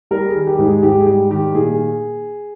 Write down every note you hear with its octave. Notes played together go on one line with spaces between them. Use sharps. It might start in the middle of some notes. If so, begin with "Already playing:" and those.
G3 A#4
G#4
D#3
G4
G#2
G#4
G#2 G4
G#4
G3 G4
D#3 G4
A#2 G#4